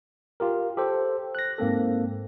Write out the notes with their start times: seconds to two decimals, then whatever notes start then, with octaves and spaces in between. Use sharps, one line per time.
0.40 F4 G4 A#4
0.77 G4 A4 C5
1.35 F#6 A#6
1.58 G#2 A#3 C4 A4